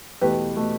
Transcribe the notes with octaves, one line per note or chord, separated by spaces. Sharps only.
E2 B2 A3 G4 B4
B2 A3